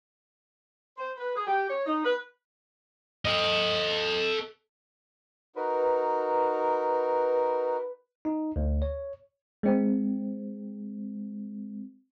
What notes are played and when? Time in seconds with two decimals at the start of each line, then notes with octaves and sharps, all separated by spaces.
0.98 C5
1.17 B4
1.35 G#4
1.47 G4
1.69 C#5
1.86 D#4
2.04 B4
3.25 A4 D#5
5.56 D#4 F#4 A#4 B4
8.25 D#4
8.56 D2
8.82 C#5
9.63 G#3 C4